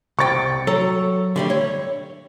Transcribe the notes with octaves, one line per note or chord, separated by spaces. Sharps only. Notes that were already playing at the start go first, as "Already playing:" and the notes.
C2 G5 C#6 A6
F#3 A4 A#5
D3 G3 A3
C#5